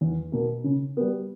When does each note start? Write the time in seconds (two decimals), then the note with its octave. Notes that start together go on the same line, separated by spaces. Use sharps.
0.01 E2
0.32 B2 A#3
0.64 C#3
0.97 G3 B3